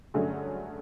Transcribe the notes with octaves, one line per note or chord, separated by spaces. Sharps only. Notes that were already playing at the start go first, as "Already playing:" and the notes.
G2 D3 F#3 A3 C#4 G#4